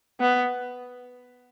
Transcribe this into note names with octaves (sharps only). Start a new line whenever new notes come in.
B3